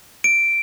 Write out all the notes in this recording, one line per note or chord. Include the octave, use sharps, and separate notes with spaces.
D7